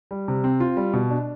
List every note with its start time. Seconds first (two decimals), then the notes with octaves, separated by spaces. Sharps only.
0.11 G3
0.28 C3
0.44 C4
0.60 F4
0.77 G3
0.93 B2
1.10 D4